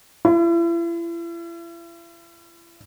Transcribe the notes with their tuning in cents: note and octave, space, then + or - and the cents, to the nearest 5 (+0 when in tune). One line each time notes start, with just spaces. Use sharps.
E4 +40